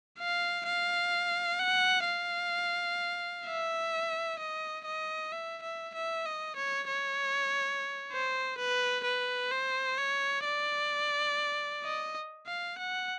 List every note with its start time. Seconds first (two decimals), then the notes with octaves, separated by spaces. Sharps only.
0.19 F5
0.66 F5
1.59 F#5
2.06 F5
3.46 E5
4.39 D#5
4.85 D#5
5.32 E5
5.63 E5
5.94 E5
6.26 D#5
6.56 C#5
6.88 C#5
8.12 C5
8.58 B4
9.04 B4
9.51 C5
9.97 C#5
10.45 D5
11.84 D#5
12.47 F5
12.78 F#5